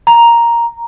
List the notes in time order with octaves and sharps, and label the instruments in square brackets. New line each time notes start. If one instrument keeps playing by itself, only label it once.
[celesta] A#5